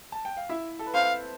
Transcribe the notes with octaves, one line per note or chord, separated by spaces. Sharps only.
A5
G5
F5
E4 E5
A4
B4
C4 C5 F5